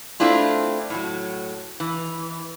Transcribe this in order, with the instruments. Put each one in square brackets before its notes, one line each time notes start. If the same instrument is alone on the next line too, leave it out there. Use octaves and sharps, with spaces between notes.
[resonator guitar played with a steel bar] A3 C4 D4 E4 F4
A2 F#3
E3